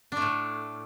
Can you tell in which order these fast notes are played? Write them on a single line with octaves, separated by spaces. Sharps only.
D4 A3 A2